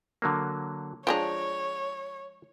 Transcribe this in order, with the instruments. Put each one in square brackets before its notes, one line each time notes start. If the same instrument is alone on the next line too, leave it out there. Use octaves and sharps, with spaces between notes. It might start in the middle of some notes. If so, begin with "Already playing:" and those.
[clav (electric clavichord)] D3 F#3 A#3
[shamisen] F3 G#3 D4 [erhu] C#5 [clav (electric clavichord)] G5 A#5